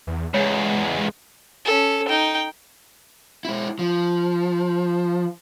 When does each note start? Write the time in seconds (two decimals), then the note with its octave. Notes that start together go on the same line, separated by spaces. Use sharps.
0.07 E2
0.34 E2 C#3 G#3 C#5
1.65 C#4 A4
2.08 D#4 G5
3.45 G#3 E4
3.79 F3